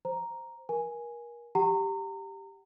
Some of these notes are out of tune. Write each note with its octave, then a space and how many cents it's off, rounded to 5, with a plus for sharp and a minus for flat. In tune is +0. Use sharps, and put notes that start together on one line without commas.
C5 +0 A#5 +0
A#4 +30 G#5 +0
G4 +0 F#5 +40 A#5 -30